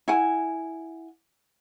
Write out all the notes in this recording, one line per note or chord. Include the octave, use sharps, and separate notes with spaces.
E4 F#5 G#5